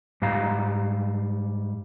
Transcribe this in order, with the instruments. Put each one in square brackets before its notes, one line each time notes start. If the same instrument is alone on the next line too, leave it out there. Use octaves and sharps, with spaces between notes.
[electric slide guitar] G#2 G3 F5 A#5